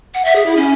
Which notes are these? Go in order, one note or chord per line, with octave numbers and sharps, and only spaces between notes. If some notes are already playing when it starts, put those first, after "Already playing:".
F#5
E5
G#4
E4
C#4